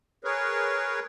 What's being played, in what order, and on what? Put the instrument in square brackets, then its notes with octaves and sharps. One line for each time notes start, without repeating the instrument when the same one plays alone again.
[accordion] G#4 A#4 B4 C#5